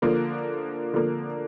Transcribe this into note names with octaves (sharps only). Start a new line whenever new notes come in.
D3 F3 A#3
D3 F3 A#3